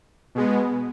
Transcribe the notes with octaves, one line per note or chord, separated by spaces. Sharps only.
B2 G#3 B3